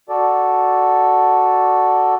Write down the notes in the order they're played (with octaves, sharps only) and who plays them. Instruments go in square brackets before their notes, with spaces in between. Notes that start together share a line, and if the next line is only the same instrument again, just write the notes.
[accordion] F#4 A4 D5